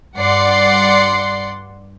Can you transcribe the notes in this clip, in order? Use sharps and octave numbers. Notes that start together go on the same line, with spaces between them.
G2 D5 F#5 C6 C7